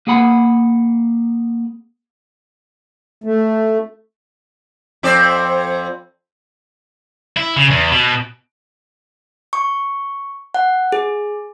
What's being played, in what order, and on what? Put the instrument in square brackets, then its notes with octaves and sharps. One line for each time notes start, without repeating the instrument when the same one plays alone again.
[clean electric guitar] A#3 G#4 F#5 B5
[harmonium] A3
[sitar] F2 C4 D5
[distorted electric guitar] E4
C#3
E2
B2
[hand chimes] C#6
F#5
G#4